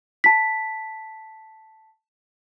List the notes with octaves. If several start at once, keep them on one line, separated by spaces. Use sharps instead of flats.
A5 B6